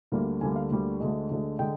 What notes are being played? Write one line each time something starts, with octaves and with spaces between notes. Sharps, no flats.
D2 D3 G3 A#3
D2 D3 G3 A#3 G#5
F5
D2 D3 G3 A#3
D2 D3 G#3
D2 D3 G#3
D3 G#3 G5